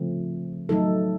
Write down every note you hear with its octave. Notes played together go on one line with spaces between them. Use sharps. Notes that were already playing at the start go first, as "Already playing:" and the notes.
Already playing: C#3 F3 A3 C4
F#3 A3 D#4 A4